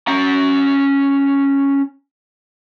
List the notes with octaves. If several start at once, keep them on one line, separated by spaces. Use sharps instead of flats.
C#4 A#5